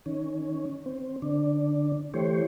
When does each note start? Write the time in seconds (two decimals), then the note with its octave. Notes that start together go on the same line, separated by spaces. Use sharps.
0.06 D#3 C#4
0.86 C4
1.22 D3 D4
2.14 E3 A3 G4 C5 C#5